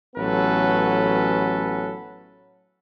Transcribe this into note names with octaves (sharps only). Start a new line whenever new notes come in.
A1 F#3 B3 C#4 A4 B4